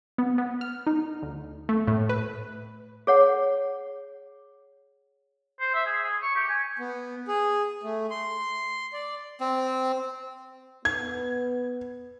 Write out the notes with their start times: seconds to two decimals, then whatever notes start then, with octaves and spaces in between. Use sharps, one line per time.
0.18 B3
0.38 B3
0.61 F6
0.87 D#4
1.22 D2
1.69 A3
1.87 A2
2.09 B4
3.07 G#4 C#5 F#5
5.61 C5
5.74 E5
5.86 G#4
6.04 G#4
6.23 C#6
6.36 G4
6.49 G#5
6.79 B3
7.28 G#4
7.83 A3
8.11 C6
8.93 D5
9.40 C4
10.85 B3 G#6